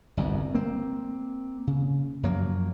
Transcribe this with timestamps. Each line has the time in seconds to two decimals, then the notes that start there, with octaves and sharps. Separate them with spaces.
0.17 G1 C2 F#2
0.55 A#3 C4
1.67 C#3
2.23 F#2 F3 F#3 A#3